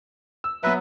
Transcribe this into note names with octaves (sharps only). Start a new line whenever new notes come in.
E6
F#3 B3 B4 E5